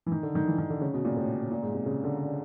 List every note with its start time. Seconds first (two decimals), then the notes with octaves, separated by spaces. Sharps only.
0.06 E3
0.12 D#3
0.23 D3
0.35 D#3
0.47 E3
0.58 D#3
0.70 D3
0.81 C#3
0.94 B2
1.05 A#2
1.17 A2
1.51 A#2
1.63 G#2
1.74 C3
1.86 C#3
2.04 D3